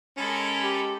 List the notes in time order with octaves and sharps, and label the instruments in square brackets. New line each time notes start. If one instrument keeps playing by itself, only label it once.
[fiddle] G#3 B5 [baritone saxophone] C#4 [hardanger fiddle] A4 A#4
[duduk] G4